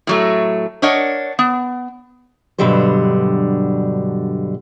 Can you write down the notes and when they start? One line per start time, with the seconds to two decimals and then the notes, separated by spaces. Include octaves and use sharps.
0.07 A2 F#3 A3
0.82 D4 A#4 C#5 D#5 F#5
1.39 B3
2.58 G2 B2 D3 F#3 G3 C5